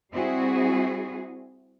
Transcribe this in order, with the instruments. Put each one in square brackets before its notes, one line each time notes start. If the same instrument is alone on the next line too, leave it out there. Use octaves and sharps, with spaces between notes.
[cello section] G3 C4 E4 F#4 G#4